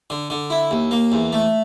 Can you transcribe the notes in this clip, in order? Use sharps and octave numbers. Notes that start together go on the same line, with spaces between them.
D3
D3
E4
D#2
A#3
E2
A3